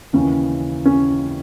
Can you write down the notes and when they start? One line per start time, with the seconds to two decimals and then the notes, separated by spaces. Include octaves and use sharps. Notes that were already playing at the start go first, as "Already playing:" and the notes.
0.13 D#2 C#3 E3 C#4
0.85 C#4